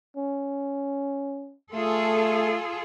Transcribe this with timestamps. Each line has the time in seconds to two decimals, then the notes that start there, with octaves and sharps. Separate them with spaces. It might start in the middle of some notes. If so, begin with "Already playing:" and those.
0.16 C#4
1.73 A3 F4 G#4 A4